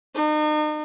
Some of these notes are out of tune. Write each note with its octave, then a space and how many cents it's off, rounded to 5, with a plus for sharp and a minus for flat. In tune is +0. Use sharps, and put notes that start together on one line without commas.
D#4 -40